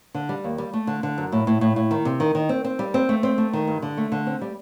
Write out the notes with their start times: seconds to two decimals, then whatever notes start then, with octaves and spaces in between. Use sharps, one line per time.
0.14 D3
0.29 G3
0.44 D#2
0.58 G3
0.73 A3
0.87 D3
1.03 D3
1.18 F#2
1.32 A2
1.47 A2
1.61 A2
1.76 A2
1.91 D#3
2.05 C3
2.20 D#3
2.35 D#3
2.49 C4
2.64 C4
2.79 G3
2.94 C4
3.09 A3
3.23 C4
3.38 A3
3.53 D#3
3.67 G2
3.82 D3
3.97 A3
4.12 D3
4.27 C4
4.41 G3